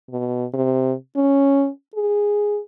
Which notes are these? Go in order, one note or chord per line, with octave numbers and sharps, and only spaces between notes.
B2
C3
C#4
G#4